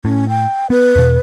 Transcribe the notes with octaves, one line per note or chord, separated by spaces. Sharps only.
A2 C#4
G5
B3 B4
E2 B2